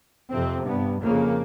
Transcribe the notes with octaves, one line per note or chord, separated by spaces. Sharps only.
F2 C3 C4
G2 B3
F2 C#3 A#3